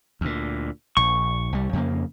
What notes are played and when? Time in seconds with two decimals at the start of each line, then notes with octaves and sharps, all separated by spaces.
0.21 D2 A#2
0.97 A#1 C#6
1.52 C2 G3
1.73 F2 C#3 A#3